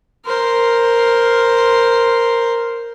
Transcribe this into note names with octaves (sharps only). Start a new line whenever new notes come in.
A#4 C5